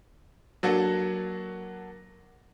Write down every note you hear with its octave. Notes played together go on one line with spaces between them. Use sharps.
F#3 A#3 D4 F#4 A4